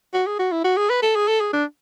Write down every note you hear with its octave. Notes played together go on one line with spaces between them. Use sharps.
F#4
G#4
F#4
E4
F#4
G#4
B4
A4
G#4
A4
G#4
D4